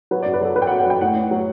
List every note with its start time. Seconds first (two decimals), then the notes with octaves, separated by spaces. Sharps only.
0.11 F#3 B4
0.22 D5
0.26 F#2
0.34 B4
0.41 F#3 A4
0.56 F#3 B4
0.62 G5
0.67 F#5
0.71 F#2
0.79 F#5
0.86 F#2 G5
1.01 A2 F#5
1.16 A2
1.31 F#3